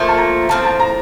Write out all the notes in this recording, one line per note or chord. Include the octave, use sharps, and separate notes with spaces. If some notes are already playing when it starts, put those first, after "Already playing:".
Already playing: A#2 F3 A3 E5
A5
A#5
A2 F3 C4 A5
A5
A#5